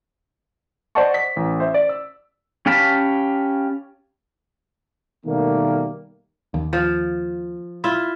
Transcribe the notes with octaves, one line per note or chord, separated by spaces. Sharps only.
C5 D5 D#5 F#5 A5 C#6
B6
A1
C5 E5
D5
E6
C#4 G4 F5 A5 B5
B2 D#3 G3 A3 A#3
D#2
F3
E4 F4 E5